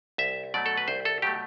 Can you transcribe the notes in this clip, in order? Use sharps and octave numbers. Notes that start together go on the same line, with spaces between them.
C2 E5
B2 F#3 A3 D5
A4
B4
C2 C5
A4
B2 F#3 A3 G4